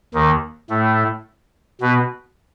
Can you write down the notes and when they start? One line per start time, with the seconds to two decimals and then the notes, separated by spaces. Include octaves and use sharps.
0.14 D#2 D#3
0.70 A2 A3
1.81 B2 B3